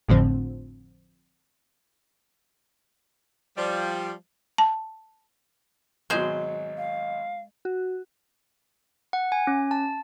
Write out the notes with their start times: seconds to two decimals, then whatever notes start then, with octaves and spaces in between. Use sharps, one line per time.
0.08 G#1 F2 A2 D3 F3 C4
3.57 F3 G3
4.58 A5
6.10 G#1 B2 F#3 G#3 C5 D#5
6.77 F5
7.65 F#4
9.13 F#5
9.32 G#5
9.47 C#4
9.71 A5